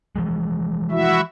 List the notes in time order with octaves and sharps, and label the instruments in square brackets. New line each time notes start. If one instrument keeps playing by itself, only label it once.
[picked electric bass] E3 F3 G#3
[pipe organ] E4 F#4 E5